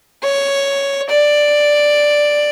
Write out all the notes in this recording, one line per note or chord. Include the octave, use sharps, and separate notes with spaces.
C#5
D5